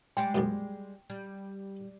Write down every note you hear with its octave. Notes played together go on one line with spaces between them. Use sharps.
G3 G#3 D5 G5
B1 F2 A#2
G3